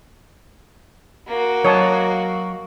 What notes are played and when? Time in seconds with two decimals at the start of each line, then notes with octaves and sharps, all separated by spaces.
1.28 A#3 F#4
1.65 F#3 C#5 D#5 A5